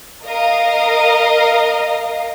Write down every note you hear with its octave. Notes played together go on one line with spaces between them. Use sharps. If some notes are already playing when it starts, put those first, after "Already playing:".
A#4 D#5 F5